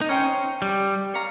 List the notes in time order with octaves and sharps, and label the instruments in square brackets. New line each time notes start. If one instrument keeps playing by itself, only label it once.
[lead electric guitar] D#4
[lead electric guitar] C#4 [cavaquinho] C5 G5 A#5 C#6
[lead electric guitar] G3
[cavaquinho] C#5 F5 A#5